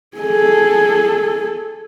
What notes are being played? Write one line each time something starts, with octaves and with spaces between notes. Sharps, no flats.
G#4 A4